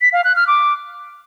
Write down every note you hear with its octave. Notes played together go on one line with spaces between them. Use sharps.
B6
F5
F#6
F6
D6